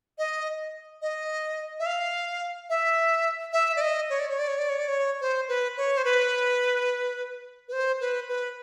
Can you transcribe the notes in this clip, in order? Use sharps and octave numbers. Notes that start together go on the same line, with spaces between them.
D#5
D#5
E5
F5
E5
E5
D5
D#5
C#5
D5
C#5
D5
C#5
D5
C#5
D5
C#5
C5
B4
C#5
C5
B4
B4
C5
B4
B4